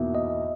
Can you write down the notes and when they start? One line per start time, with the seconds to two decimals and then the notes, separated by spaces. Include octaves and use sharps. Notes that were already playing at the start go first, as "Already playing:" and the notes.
Already playing: E2 B2 A#3 D#4 F#4 E5
0.15 D#5